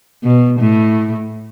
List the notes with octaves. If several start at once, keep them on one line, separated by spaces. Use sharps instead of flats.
B2
A2